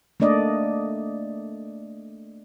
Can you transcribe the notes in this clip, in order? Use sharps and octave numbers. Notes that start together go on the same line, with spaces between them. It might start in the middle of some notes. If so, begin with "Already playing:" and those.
A3 A#3 D4 D5 D#5